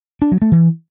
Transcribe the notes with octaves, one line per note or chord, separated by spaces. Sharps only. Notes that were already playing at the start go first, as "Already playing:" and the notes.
D4
F#3
A3
E3